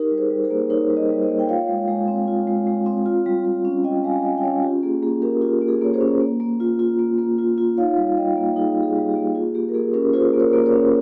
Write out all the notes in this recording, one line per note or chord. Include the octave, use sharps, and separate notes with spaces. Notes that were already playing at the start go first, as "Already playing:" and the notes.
Already playing: D#4 G4 A#4
G3
G#4 C5
G3
G#4 C5
A#3
D#4 A#4 C#5
G3
C5 D#5
G3
C5 D#5
A#3
G5
F4 C#5 F5
G#3
G#3
C4
F4
G#3
G#3
C4
F4
G3
G3
C#4
F4 D#5 G5
G3 F5 G#5
G3 D#5 G5
G5
C#4 C#5 F5
F4 G4
A#3 G#4
A#3 G#4
C#4 G4 A#4
F4 G4
A#3
G#4
A#3 C#5
G#4 C5
C#4
A#3
A#3
F4
F4
A#3
A#3
F4
F4
D#4 C#5 F5
G3
G3 D#5 G5
A#3
D#4 G#4
G3 G4
G#4
G3
G4
A#3
F4 G#4
A#3 G4
A#4
A#3 G#4
C#4 G4 A#4
F4 G#4 C5
A#3
A#4 C#5
A#3
A#4 C#5
C#4